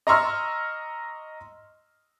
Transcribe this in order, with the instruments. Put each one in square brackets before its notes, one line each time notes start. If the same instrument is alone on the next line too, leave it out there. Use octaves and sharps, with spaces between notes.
[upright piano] D#5 A#5 C6 C#6 E6 F6